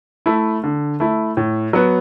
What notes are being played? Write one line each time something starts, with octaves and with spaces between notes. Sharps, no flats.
A3 E4
D3
A3 E4
A2
F#3 B3